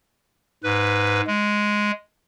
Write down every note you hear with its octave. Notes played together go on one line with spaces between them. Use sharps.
G#2 B4
G#3